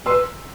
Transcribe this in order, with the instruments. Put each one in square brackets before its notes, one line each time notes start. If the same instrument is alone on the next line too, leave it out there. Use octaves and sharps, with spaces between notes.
[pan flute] B4 [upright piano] C6 E6